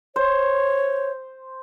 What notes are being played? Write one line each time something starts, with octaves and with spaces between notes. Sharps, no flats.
C5 C#5